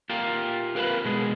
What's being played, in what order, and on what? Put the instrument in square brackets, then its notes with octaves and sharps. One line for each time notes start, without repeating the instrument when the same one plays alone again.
[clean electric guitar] F4 G4 A#4
A#4 B4 F5 A5 B5
B2 G#3 G#4